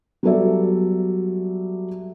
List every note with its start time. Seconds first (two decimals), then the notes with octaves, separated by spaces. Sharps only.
0.23 F#3 G3 B3 A4 D5 E5